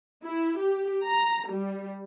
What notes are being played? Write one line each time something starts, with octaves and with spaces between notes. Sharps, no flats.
E4
G4
A#5
G3